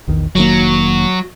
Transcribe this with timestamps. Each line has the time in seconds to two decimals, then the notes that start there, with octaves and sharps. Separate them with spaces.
0.08 A#1 E2 D#3
0.35 F1 D#3 F#3 A#3